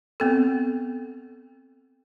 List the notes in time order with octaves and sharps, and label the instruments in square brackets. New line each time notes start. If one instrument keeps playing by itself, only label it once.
[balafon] B3 C4 A4